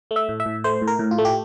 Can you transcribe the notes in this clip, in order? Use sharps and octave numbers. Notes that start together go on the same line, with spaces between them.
A3
E5
A2
E5
A2
A3 C5
A2
A#4
A2
F4
A3
G4